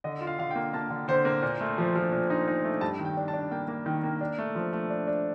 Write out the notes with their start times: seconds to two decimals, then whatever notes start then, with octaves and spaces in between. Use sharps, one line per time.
0.04 D3 D#5
0.21 F4
0.27 F5
0.39 D3 F5
0.51 G5
0.56 A#3
0.73 A#3 A5
0.90 D3
1.08 D3 C5
1.25 A#3
1.42 A#2
1.61 A3
1.78 F3
1.95 F3
2.12 A#2
2.30 D#4
2.48 D#4
2.65 A3
2.81 G2 A5
2.99 D#3
3.05 G5
3.17 D4
3.28 A5
3.33 D4
3.51 A#3 G5
3.68 A#3
3.86 D#3
4.03 A#3
4.21 D4
4.38 A3
4.55 F3
4.73 A3
4.90 D4
5.07 D4